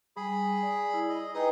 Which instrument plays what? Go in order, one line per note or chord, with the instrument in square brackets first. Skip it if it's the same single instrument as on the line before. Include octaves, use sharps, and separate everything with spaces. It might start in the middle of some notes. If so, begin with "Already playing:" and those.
[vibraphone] G3 [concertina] G#4 B5
[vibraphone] D5
E4
[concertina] D#5
[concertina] D#4 G#4 D#6 [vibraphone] B4 D#5 G5